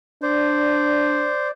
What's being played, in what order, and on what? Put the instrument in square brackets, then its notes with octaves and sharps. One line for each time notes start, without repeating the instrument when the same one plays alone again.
[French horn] D4 [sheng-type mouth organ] C5 [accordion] D5